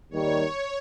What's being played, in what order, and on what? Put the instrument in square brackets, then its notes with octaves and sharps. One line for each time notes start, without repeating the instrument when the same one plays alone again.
[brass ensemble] D#2 D#3 G3 [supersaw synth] C#5